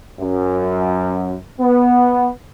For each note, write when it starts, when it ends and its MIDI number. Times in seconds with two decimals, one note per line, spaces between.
0.20 1.37 42
1.60 2.29 59